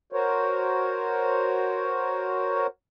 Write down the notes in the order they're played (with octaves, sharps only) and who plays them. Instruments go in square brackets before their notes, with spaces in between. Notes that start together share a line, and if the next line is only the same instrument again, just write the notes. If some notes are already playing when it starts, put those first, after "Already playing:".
[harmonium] F#4 A#4 C5 C#5